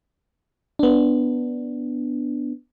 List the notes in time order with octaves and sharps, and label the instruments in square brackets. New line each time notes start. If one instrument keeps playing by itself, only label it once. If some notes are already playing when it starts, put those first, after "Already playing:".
[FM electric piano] B3 D4